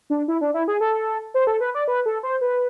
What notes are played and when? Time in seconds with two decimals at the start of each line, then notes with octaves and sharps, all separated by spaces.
0.10 D4
0.28 E4
0.41 D4
0.54 E4
0.68 G#4
0.81 A4
1.34 C5
1.47 A4
1.61 B4
1.75 D5
1.88 B4
2.06 A4
2.23 C5
2.41 B4